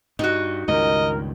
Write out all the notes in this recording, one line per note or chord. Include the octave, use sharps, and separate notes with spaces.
G2 D#4 F#4
C#2 G2 D#3 A#4 D#5